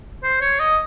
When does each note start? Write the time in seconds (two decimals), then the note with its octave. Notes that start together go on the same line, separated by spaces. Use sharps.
0.23 C5
0.41 C#5
0.60 D#5